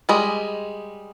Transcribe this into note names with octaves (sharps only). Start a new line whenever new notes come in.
G3 G#3 D#5